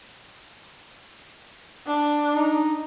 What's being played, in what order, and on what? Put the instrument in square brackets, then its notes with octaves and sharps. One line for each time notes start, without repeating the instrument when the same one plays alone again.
[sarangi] D4
[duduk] D#4